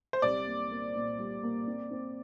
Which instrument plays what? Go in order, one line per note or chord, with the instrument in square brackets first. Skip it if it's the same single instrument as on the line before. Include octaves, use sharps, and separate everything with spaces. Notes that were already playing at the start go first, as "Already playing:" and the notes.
[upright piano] C5
[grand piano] C2 [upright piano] D5
[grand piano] A#3
A#3
A#2
G3
A#3
C4
C4